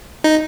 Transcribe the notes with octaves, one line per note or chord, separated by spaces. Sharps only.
D#4